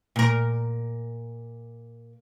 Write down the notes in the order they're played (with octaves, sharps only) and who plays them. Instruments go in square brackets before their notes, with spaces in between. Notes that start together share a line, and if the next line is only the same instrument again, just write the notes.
[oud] A#2 A#4